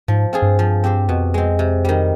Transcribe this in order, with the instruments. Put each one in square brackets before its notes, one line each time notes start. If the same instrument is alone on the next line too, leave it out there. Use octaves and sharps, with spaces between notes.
[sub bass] G#2 [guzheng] F3
[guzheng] C4 F4 G#4
[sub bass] G2
[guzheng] F3
C4 G4 C5
[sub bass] F2 [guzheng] B2
[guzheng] G#3 C4
C3
D#3 G3